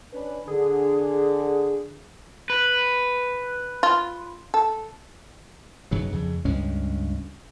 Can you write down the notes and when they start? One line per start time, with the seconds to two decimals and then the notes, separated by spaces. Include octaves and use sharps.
0.13 C#4 D4 B4
0.48 D3 G#4
2.50 B4
3.83 F4
4.54 A4
5.91 B1 F#2 C#3 F#3
6.12 F2 C#3
6.45 C#2 G2 G#3 C#4